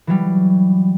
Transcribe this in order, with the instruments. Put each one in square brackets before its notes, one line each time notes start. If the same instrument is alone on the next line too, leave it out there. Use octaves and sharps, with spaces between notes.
[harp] E3 F#3 G3